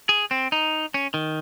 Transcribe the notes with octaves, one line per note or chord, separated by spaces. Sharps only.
G#4
C4
D#4
C#4
D#3